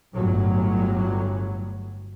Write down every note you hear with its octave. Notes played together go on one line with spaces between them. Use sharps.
G1 A2 F#3